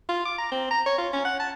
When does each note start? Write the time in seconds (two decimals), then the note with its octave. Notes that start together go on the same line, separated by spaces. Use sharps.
0.09 F4
0.26 D6
0.38 A#5
0.52 C4
0.71 A#5
0.86 C#5
0.98 F4
1.13 C#4
1.25 F#5
1.40 A5